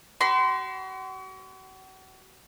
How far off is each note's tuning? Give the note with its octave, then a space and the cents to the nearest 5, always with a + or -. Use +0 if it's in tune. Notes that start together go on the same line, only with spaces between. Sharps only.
F#4 +40 C6 -25